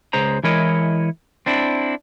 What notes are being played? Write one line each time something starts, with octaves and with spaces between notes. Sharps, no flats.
C#2 G#4 C5 A#5
E3 G#3 E4 A#4 C#5 D#5
C4 D4 E4